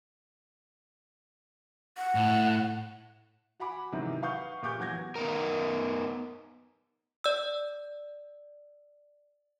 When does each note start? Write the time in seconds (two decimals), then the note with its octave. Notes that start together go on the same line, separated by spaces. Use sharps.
1.97 F#5
2.15 A2
3.60 F#4 F#5 G#5 B5 D6
3.92 G#2 C3 D#3 E3 F#3 D#4
4.22 B4 F5 F#5 C#6 D#6 G6
4.62 A#2 G4 C#6 D6 G6
4.79 E2 F#3 F#5 G6 G#6 A#6
5.16 B3 D#4 A#4
7.24 D5 E6